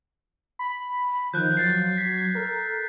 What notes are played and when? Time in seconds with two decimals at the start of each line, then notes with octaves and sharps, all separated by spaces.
0.59 B5
1.34 D#3 F3 F#6 G6
1.57 F#3 A6 C7
1.98 F#3 G#6 B6
2.35 A4 A#4